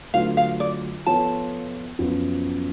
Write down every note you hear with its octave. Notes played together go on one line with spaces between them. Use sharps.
D3 F#3 A3 F4 B4 F5
F5
D5
F3 B3 F4 A4 C#5 A5
F#2 F3 B3